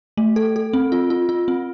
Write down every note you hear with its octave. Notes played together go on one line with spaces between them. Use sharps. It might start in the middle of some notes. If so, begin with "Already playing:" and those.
A3
A4
A4
C4
F4
F4
F4
C4